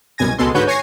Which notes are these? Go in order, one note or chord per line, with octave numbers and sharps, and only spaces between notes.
C2 F#2 B2 G#5 G#6 A#6
C#2 B2 G#3 B3 A4 C6
G#2 D3 F#4 B4 C#5 G6
C#5 G#5 C#6 G#6 A#6 C7